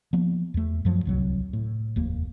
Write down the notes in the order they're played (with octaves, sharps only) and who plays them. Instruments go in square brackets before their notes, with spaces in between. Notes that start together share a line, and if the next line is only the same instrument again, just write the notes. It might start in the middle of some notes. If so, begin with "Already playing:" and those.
[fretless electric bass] F3 A#3 B3
E2 A3
F#2 F3 F#3
D1 C2 F#3
A2
F1 D#2 A#3